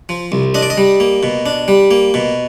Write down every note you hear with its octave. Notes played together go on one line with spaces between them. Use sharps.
F3
C2
D4 D#5
D5
D#5
G3
A#3
B2
D4
G3
A#3
B2